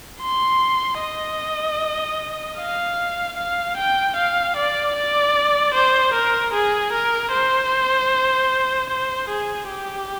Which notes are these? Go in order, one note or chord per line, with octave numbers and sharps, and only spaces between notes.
C6
D#5
F5
F5
G5
F5
D5
D5
C5
A#4
G#4
A#4
C5
C5
G#4
G4